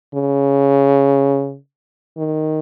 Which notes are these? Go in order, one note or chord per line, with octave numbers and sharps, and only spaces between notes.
C#3
D#3